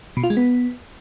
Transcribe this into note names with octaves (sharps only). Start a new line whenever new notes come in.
B2
F4
G#3
B3